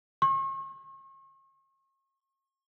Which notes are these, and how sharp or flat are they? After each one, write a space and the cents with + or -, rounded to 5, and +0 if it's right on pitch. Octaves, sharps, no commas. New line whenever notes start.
C#6 -45